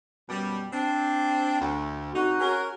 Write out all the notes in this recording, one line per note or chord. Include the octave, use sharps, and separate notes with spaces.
F#2 B2 G3
C4 D4
D2
C3 D#4 F#4
C#4 G#4 A#4